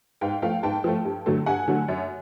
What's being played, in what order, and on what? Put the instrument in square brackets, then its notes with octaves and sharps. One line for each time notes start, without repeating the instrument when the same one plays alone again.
[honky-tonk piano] G#2 F5 G5
F3 A3 F5 G5
G#2 G5 A5
F3 A3
G2
D3 F#3 A3
G2 F#5 G#5
D3 F#3 A3
F#2